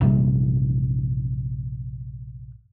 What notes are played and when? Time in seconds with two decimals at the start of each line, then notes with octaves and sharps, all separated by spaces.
0.01 A#1 F#2 C3 G3